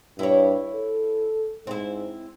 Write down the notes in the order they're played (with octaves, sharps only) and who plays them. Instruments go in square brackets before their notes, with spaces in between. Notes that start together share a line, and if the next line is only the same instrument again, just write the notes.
[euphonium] G2 [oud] E4 C#5
[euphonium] A4
[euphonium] G#2 [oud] C4 E4